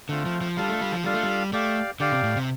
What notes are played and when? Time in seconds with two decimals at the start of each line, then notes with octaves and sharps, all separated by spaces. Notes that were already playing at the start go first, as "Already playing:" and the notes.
0.09 D3 A3 C4 F4
0.26 F3
0.41 F3
0.57 G3 D4 F4 A4 F5
0.68 A3
0.81 G3
0.93 F3
1.04 G3 D4 F4 A4 F5
1.14 A3
1.23 G3
1.53 A3 G4 D5 F5
2.00 D3 G4 D5 F5
2.12 C3
2.23 A2
2.37 C3